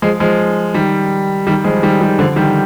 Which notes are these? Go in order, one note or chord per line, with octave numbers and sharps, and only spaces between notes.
F3 G#3
F3 G#3
D#3 G3
D#3 G3
F3 G#3
D#3 G3
D#3 G3
D3 F3
D#3 G3